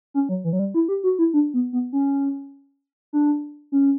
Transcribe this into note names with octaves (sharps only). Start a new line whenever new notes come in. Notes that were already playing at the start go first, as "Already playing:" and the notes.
C#4
F#3
E3
F#3
G3
E4
G4
F#4
E4
D4
B3
B3
C#4
D4
C#4